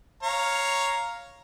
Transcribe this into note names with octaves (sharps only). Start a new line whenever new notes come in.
C#5 F5 A#5